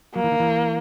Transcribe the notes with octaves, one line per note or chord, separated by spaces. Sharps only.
F#3 A#3
E3
D#3
E3